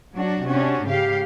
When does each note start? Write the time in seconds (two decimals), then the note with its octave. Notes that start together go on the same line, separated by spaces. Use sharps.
0.15 F#3 D4 F#4
0.46 C3 C#4 D4 F#4
0.85 G#2 C#3 G4 F5